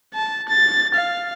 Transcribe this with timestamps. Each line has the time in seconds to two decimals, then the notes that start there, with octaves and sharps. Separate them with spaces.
0.15 A5
0.49 A6
0.95 F5